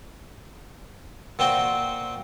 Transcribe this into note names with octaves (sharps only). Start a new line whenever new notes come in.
A#2 C4 F#4 G5